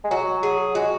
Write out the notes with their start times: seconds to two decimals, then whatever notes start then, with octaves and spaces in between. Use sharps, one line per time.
0.04 G#3
0.11 F#3 F#4
0.43 G#4
0.75 G#3 F#4